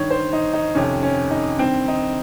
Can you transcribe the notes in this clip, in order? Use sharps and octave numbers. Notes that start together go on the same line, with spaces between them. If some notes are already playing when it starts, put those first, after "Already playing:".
Already playing: G2 D#3 C#5
C5
D#4
D#4
F2 C3 D#3 C#4
C#4
D#4
G2 D#3 C4
D#4